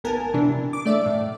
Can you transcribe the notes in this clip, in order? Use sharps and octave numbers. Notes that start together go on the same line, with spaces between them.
G#1 B3 A#4 G#5 A5
C3 E3 D4
D6
A3 D5 E5
A2